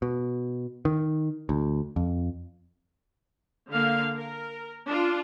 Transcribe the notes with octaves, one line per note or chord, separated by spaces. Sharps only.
B2
D#3
D2
F2
D3 A#3 F5
A#4
D4 F4